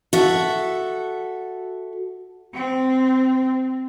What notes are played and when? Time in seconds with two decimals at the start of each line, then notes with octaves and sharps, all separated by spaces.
0.13 F#4 A4 E5
2.54 C4